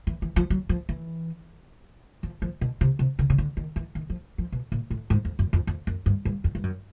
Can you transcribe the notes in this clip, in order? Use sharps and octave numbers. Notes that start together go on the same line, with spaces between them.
E3
E3
F3
F#3
F3
E3
F3
F3
B2
C3
C3
C#3
C#3
D3
D#3
E3
D#3
F3
F3
B2
A#2
A2
G#2
F2
F#2
F2
F2
F#2
G2
G2
F2
G2
F#2